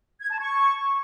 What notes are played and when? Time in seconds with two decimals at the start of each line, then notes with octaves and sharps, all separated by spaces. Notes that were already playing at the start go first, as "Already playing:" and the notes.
0.20 G#6
0.30 A5
0.39 C#6